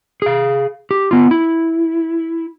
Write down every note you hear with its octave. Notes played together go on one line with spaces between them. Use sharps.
G#4 F5
G4
B3 F4
E4